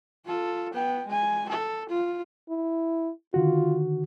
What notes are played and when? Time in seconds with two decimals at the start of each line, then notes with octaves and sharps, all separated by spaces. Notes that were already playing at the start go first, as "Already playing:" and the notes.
0.25 F4 A4
0.73 B3 G5
1.07 G#3 G#5
1.49 A4
1.89 F4
2.50 E4
3.34 D3 D#3 F4 F#4